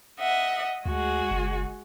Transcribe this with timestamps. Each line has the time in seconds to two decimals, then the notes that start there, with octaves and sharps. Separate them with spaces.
0.19 D#5 E5 F#5
0.86 D2 G#3 F#4 G#4
1.31 F#1